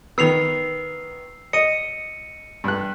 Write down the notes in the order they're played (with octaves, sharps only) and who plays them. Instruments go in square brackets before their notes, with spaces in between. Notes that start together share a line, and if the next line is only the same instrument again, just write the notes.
[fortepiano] D#3 B3 [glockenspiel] E6 C7 F7
[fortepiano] D#5 [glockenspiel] C#7 D#7
[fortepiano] G2 F#6